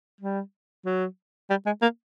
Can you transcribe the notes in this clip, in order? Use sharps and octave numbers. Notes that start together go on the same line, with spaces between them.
G3
F#3
G3
G#3
A#3